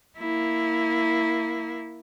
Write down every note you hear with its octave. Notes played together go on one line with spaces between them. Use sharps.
A#3 E4